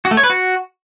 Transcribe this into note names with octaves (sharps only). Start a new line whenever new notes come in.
F#4
A3
C#5
B4
F#4